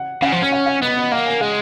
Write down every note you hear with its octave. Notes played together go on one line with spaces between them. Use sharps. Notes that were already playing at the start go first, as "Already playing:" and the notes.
Already playing: F#5
C#3 F#5
F3
C#4
F#5
F#5
B3 D#5
D#5
A#3 F#5
G#5
G#3 F#5